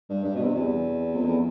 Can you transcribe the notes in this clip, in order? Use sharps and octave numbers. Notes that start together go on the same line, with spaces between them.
G2
G2
B2
C3
E2
F2
E2